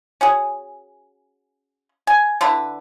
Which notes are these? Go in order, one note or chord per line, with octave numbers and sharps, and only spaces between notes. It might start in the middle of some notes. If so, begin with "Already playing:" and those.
C#4 F#4 G#4
G#5
D3 D4 E4 B4